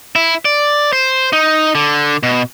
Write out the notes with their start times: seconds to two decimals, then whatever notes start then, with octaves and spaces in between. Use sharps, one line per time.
0.16 E4
0.45 D5
0.93 C5
1.33 D#4
1.75 D3
2.23 B2